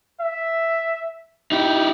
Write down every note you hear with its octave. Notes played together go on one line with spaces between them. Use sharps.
E5
D#4 E4 G4